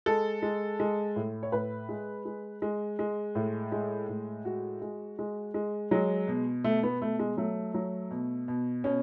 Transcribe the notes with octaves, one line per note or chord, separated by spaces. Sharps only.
G#3 A4
G#3
G#3
A2
C#5
A2 B4
G#3
G#3
G#3
G#3
A2
G#3
A2
G#3 F#4
G#3
G#3
G#3
F#3 G#3
B2
B2 A3
B3
B2 A3
G#3
F#3 A3
F#3
B2
B2
B2 C#4